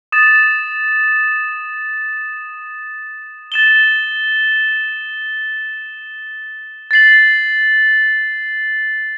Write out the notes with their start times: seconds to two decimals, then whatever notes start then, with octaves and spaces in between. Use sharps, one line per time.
0.12 D#6 A6 E7
3.52 A6 E7 G7
6.91 A6 C7 F#7